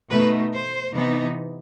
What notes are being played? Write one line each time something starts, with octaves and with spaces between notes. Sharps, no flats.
B2 A3 D#4 B4
C5
C3 E3 B3 D#4